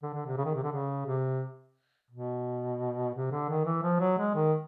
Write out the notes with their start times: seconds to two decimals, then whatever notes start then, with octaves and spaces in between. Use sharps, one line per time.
0.03 D3
0.14 D3
0.26 C3
0.37 C#3
0.45 D#3
0.55 C3
0.63 D3
0.72 C#3
1.06 C3
2.11 B2
3.14 C3
3.32 D3
3.49 D#3
3.65 E3
3.83 F3
4.00 F#3
4.19 G#3
4.35 D#3